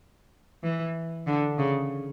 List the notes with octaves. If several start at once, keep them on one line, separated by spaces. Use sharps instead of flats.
E3
D3
C#3